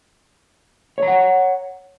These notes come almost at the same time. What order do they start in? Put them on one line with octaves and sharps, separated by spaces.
C#5 A#5 F#5